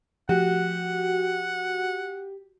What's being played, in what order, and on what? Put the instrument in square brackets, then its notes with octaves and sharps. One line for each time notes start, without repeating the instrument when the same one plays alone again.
[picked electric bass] F3 A3 [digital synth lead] F#4 [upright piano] G4 [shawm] F#5